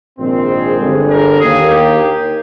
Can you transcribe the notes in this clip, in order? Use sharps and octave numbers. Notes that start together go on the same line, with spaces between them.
A#1 G#2 D#3 G#3 C4
G#4
G1 G2 D3
A#4
D#2 D#3 A#3 G#4
G4